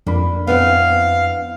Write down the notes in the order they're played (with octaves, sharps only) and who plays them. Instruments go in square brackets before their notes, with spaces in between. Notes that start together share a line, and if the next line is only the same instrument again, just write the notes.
[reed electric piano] F2 D4 B5 [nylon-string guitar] A#3
[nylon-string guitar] B3 C4 E4 [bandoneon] F5